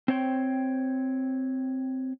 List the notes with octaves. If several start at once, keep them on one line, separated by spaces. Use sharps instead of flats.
C4 C5 C#5 G5